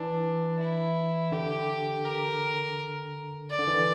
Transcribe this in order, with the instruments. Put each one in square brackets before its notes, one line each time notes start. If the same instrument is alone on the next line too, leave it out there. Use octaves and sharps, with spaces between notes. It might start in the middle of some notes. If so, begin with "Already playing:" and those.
Already playing: [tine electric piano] E3 [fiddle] D4
[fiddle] E4
[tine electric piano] D3 [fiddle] G4
[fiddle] A#4
D5
[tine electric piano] D3
E3